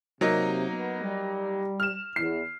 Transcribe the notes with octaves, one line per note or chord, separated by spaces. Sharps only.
C3 F#3 A#3 D#4
B3
G3
F6 E7
E2 C7